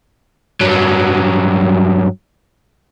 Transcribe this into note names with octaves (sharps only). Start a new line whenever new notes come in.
G2 F#3